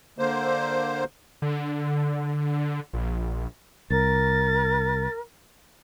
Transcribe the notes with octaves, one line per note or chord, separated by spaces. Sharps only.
D3 A#3 C5
D3
A#1
C2 A#4 A6